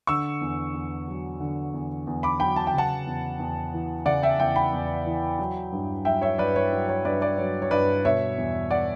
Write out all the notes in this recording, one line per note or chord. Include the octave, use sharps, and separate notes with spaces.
D3 C#6 E6
E2
E2
F#3
D3
E2
E2
B5 D6
F#3 G5 B5
A5
G5
C#3 F#5 A5
E2
E2
E3
C#3 D5 F#5
E5 G5
E2 E5 G5
G5 B5
E2
E3
F#3
G2
F#3 E5 G5
C#5 E5
G2 B4 D5
C#5
F#3
C#5
G2 B4 D5
B4 D5
F#3 C#5
C#5
G2 B4 D5
B2 C#5 E5
E2
D5 F#5